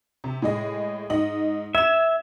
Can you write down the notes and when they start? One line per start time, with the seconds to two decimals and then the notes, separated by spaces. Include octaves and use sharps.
0.24 C3
0.42 A2 G#3 D#5
1.10 G#2 D#5 F#7
1.75 E5 G#6 E7